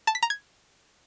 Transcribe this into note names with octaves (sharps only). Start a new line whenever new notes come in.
A5
B6
A#5
G#6